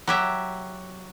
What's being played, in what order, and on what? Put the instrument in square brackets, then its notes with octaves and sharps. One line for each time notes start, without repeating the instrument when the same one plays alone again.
[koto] F#3 G4 E5